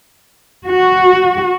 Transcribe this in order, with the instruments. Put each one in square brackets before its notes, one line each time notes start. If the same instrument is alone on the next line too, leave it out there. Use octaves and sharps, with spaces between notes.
[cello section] F#4